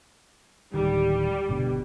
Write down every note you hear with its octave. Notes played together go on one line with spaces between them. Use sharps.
D1 D#3 G3
G1 B2 D3